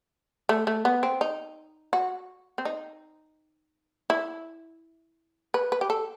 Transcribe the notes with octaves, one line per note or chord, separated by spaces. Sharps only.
A3
A3
B3
C4
D#4
F#4
C4
D#4
E4
B4
B4
G4
A4